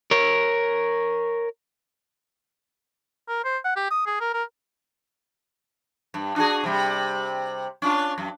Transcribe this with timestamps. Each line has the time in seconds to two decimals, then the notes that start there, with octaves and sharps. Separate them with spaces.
0.11 A#4 C#5
3.28 A#4
3.44 C5
3.64 F#5
3.76 G4
3.91 D#6
4.06 G#4
4.20 A#4
4.34 A#4
6.14 G2
6.36 D4 F#4 G#4
6.64 C3 G3
7.82 C#4 D4 F4
8.18 F#2